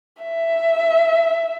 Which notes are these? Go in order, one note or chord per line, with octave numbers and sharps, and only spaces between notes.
E5